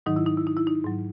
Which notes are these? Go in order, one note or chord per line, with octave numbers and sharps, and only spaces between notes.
G#2 D#3 F#3 D#4
E4
D#4
E4
D#4
E4
D#4
G#2 F#3